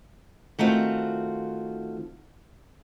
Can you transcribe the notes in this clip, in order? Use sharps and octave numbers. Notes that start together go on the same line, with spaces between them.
D#3 A3 C4 F4 F#4